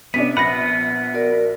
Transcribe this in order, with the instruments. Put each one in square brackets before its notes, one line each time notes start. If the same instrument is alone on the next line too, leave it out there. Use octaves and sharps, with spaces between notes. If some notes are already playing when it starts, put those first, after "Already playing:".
[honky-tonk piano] C3 C#4 D4 [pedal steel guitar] B3 [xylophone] B6
[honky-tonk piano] A#1 [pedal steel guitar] B3 B4 F#5 [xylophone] B5 A#6
[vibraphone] F#4 A#4 D5